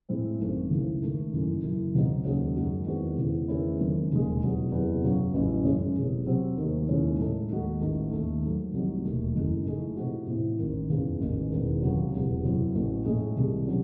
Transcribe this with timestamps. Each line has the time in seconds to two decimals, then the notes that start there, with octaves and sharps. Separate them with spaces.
0.09 A2 G#3 C4 E4
0.40 G#1 F#2 D#3 A3 C4
0.70 C#2 C#3 E3
1.02 G#2 D#3 A3
1.33 F#1 F#2 E3
1.64 F#1 F#2 E3
1.94 C#2 C#3 F#3 C4 D#4
2.25 D#2 C#3 F#3 C#4 G#4
2.56 F#2 D#3 G#3 D#4 F#4
2.86 E2 D#3 G#3 C4 F#4
3.18 E2 C#3 E3
3.48 E2 D#3 A3 C#4 E4
3.80 F#1 F#2 D#3 G#3 C4
4.11 E1 D#2 C#3 G#3
4.41 E1 E2 C3 F#3
4.72 F#1 E2 C3 F#3
5.03 F#2 C#3 F#3
5.33 A1 G#2 F#3 C#4 E4
5.64 F#2 C#3 G#3 C#4 G#4
5.96 E1 E2 C3
6.26 C3 F#3 C4
6.57 D#2 D#3 A3 D#4
6.88 D#2 C#3 G#3 C#4 E4
7.18 A2 G#3 D#4 A4
7.49 D#2 D#3 G#3 D#4 F#4
7.81 A1 G#2 D#3 A3 D#4
8.11 D#2 D#3 A3
8.43 G#2 D#3 F#3
8.73 C2 C3 F#3 A3 D#4
9.04 E1 D#2 D#3 A3
9.35 F#1 F#2 E3 G#3 D#4
9.65 G#2 E3 A3 D#4 G#4
9.96 C3 E3 C4 D#4 F#4
10.27 A2 E3 C4
10.59 A1 G#2 D#3
10.90 F#1 E2 C#3
11.20 A1 G#2 D#3
11.51 E1 E2 D#3
11.82 C#2 C3 F#3
12.12 E1 E2 C3 F#3
12.43 F#2 C#3 F#3 C4 E4
12.74 A1 A2 F#3 A3
13.05 A2 G#3 D#4 G#4
13.36 C2 C3 D#3
13.67 C3 F#3 C#4